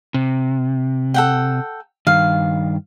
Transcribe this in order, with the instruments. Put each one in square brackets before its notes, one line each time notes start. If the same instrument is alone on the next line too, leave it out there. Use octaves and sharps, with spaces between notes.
[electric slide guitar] C3
[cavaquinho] A4 F#5 G5
[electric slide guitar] G2 D#3 [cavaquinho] F5